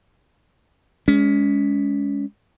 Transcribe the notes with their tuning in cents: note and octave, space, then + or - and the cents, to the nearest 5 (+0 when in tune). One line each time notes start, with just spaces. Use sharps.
G#3 +0 C#4 +25